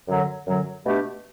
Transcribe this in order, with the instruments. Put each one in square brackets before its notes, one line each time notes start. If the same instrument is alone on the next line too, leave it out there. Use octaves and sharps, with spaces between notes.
[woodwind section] F#2 D3 F#3
F#2 D3 F#3
B2 A3 D4 G4